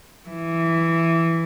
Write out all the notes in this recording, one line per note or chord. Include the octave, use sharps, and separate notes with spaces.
E3